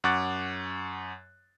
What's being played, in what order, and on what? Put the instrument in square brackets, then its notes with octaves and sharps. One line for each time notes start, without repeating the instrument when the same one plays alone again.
[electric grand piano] F#2 F#5 C#6 D6 F#6 A6